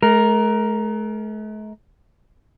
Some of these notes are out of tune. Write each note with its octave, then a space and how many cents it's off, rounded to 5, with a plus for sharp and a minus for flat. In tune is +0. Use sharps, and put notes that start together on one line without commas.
A3 -45 A#4 +5